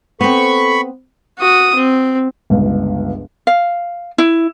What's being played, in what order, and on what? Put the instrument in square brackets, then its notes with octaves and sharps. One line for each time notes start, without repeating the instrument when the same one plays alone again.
[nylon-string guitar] B3 C4 [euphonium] A4 [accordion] B5 C#6
[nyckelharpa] F#4 D#6
C4
[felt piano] G1 C#2
[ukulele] F5
E4